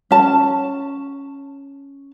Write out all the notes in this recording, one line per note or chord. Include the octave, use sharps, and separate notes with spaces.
C#4 A5